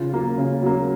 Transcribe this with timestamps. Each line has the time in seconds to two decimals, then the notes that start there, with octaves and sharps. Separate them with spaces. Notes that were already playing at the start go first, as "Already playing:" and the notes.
Already playing: C#3 F4
0.12 F#3 A#3
0.38 C#3
0.63 F#3 A#3